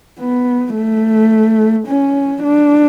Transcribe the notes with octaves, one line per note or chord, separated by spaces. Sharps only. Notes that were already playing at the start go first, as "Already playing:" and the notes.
B3
A3
C#4
D4